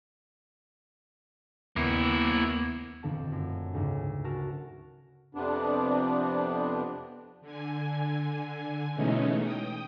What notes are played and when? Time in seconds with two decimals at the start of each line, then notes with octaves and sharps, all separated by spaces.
1.76 D#2 A#3 B3 E4
3.03 D#1 F2 D3 C4 D4 A5
3.32 F#2 A3
3.73 D2 G#2 C#3
4.24 F#4 A#4 G#5 A5 F#6 E7
5.35 F2 C3 B3 D4
7.41 D3 G#5
8.95 B2 E3 G#3 A3 C#4 D#4
9.41 G5 D#6